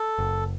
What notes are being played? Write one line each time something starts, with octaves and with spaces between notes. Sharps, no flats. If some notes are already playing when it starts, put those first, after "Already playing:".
Already playing: A4
F#1